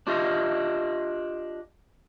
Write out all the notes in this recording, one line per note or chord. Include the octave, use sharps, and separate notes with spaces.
D4 F4 G4 D#5